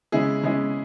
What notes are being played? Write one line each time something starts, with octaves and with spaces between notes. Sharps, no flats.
C#3 G#3 E4 G#4
C#3 G#3 E4 G#4